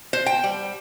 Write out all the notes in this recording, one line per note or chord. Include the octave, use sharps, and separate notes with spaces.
C5
G5
G3